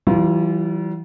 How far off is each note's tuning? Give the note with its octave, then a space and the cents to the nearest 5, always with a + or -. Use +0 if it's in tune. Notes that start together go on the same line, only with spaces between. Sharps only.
E3 +0 G3 -45 F4 -15